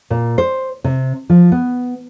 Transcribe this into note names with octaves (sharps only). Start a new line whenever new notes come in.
A#2
C5
C3
F3
B3